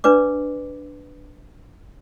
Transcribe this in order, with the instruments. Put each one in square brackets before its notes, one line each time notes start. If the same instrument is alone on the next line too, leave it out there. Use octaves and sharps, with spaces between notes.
[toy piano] D4 B4 D5 D6